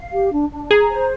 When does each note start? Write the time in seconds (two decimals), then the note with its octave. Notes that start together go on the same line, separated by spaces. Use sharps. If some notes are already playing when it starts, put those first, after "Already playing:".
Already playing: F5
0.12 G4
0.31 D4
0.51 D4
0.71 G#4 A#5
0.90 C5